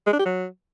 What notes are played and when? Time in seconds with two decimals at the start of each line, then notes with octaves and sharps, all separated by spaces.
0.07 G#3
0.13 D4
0.19 G4
0.26 F#3